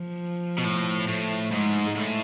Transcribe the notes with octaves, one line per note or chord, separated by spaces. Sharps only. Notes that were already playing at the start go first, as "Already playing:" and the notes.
Already playing: F3
B2
A2
A2
G#2 G#3
A2